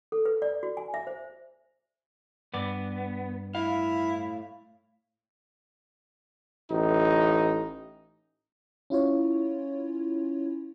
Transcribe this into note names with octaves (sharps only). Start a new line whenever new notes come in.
A4
B4
D5
F#4
G#5
E5
C5
G2 B3 D5
A2 E4 F5
A1 D#4
C#4 E4 F4 C#5